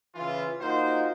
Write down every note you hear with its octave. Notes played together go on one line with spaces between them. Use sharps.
C#3 E3 F4
A#3 D#4 F4 F#4 A#4 C5